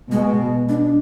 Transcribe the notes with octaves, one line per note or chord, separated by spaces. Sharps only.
B2 G#3
D4